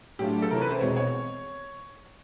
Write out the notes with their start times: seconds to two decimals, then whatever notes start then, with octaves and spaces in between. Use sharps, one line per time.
0.18 A2 F#3 A3 D4 F4 G4
0.42 A4
0.51 C3 E3 A3 C#4 E4 A#4
0.61 B4
0.71 C5
0.81 E2 B2 G#3 C4 C#5
0.97 C#5